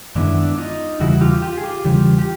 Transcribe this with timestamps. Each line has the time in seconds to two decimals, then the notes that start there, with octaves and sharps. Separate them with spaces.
0.15 F#2 D#3 G#3 B3 D4 E4
0.58 D#4 F4
1.00 E2 C#3 E3 G3 E4 F#4
1.21 F4 G4
1.42 F4 G4
1.58 G#4
1.64 F4 G4
1.85 E2 C#3 E3 G3 F4 G4
2.19 G4